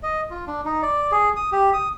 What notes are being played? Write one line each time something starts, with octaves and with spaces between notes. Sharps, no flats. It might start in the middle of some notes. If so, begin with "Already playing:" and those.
D#5
F4
D4
D#4
D5
G#4
D#6
G4
D#6